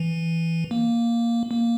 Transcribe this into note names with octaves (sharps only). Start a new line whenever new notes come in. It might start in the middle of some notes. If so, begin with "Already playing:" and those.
Already playing: E3
A#3
A#3